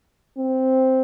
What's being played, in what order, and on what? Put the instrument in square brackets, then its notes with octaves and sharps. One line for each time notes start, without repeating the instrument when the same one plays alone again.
[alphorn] C4